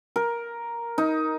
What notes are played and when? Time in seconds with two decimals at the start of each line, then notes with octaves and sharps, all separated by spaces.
0.16 A#4
0.98 D#4